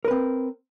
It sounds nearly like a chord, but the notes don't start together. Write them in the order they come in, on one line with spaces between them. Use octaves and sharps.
A#4 B4 C4